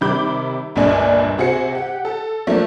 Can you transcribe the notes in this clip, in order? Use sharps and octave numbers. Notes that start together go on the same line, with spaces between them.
C3 D#3 G3 B5 D6 G6
G1 C#2 G2 A#2 D4 G#5
C3 F#4 G#4 C5 C#7
G4 F#5
A4
F3 A3 A#3 D4